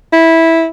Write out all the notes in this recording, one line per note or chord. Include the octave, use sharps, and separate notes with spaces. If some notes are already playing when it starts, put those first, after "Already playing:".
E4